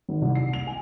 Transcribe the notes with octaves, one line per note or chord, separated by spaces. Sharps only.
G#1
C2
C7
F7
G#5